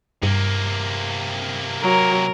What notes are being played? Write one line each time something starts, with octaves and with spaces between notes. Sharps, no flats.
G2 C3 A#3
F#3 A#4